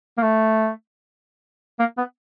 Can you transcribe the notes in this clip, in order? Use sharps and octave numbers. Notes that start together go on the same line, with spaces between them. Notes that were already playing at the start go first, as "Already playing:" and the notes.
A#3
A3
A#3
B3